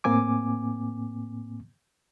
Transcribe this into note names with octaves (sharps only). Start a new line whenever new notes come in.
A2 A#3 C4 G#5 D6